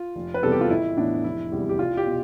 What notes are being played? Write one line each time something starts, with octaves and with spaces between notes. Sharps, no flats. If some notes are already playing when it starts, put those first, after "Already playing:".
Already playing: F4
F1
B4
E2 C3 G3 B3 A4
G4
F4
A1 E4
A2 E3 B3 D4
F1 E4
E2 C3 G3 B3
G4
C2 F4
G4
B2